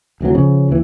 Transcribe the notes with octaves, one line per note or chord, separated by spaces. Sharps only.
F1 D2 E3 F#3
C#3 F3 C#4
D#2 E3